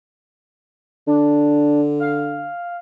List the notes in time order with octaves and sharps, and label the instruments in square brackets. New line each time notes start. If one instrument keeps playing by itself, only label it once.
[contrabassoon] D3 [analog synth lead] D4
[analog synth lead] F5